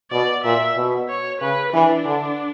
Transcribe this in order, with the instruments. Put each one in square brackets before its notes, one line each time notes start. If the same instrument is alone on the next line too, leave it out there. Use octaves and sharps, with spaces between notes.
[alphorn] B2 [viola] D5
[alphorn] A#2 [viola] E5
[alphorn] B2
[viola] C#5
[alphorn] C#3 [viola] B4
[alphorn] E3 [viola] D4
[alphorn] D3